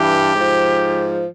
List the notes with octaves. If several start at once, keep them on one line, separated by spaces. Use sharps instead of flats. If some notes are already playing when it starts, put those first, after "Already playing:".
Already playing: G2 E3 G4
G#2 F3